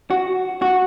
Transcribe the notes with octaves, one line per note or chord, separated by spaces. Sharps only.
F#4
F#4